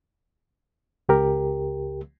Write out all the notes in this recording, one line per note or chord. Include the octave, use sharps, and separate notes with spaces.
C#2 G4 A#4